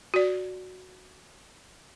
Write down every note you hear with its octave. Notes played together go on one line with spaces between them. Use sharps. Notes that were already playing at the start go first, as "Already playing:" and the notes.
F#4 D5